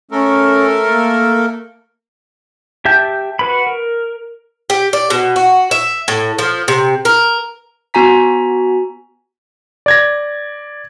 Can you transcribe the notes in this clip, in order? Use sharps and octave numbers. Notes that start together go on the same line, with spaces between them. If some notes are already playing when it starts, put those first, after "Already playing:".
A3 C#4 A4 A#4
A#3
G4 E5 G5 A5 G6
F#4 B4 B5
A#4
G4
D5
B2
F#4
E5
A2
F3
C3
A#4
B3 F#4 G#5 A#5 B6
D5 G#6 A#6